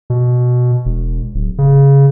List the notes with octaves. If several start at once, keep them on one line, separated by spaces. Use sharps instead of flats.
B2
E1
D1
C#3